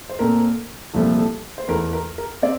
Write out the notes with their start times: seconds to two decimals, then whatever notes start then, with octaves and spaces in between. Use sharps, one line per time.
0.10 C5
0.19 A#2 A3 C4 A#4
0.93 C2 A#2 F3 A3 C4 A4
1.19 A4
1.58 C5
1.68 E2 E3 A3 A#4
1.93 A#4
2.18 A#4
2.42 C4 D5